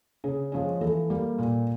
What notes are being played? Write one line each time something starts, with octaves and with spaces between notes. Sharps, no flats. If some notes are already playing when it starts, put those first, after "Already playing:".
C#3 G#4
F3 G#3 C#4
E3 A4
G3 A#3
A#2